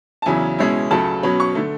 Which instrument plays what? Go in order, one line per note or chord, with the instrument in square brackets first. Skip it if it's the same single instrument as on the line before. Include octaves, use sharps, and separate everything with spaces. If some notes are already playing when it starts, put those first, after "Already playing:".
[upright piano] A5
E2 C#3 F#3 C#4 E4 G#5
B2 G#3 C#4 E4
C#2 C#3 F#3 A3 A5
B2 F#3 C#4 B5
C#6
D3 A3